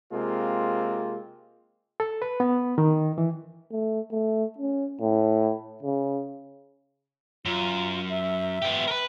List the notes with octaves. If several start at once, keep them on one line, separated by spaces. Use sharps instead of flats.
C3 G#3 A#3 C4 F4
A4
B4
B3
D#3
E3
A3
A3
C#4
A2
C#3
F#2 F4
E5
B3 G4
A#4 B4